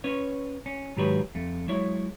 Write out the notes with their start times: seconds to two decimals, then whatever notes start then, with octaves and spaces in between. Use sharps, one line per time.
0.04 C#4 B4 C#5
0.66 C#4
0.97 G#2 D#3 F#3 G4 B4 C#5
1.35 F2 A3
1.68 F#3 G#3 E4 C#5